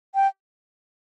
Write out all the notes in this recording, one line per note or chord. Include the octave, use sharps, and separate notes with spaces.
G5